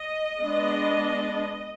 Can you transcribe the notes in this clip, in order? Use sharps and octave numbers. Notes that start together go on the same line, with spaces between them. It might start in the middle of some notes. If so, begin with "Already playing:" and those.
Already playing: D#5
G#3 B3 D4